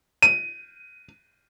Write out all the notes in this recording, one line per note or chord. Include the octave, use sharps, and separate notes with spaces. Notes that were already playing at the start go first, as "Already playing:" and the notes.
D#7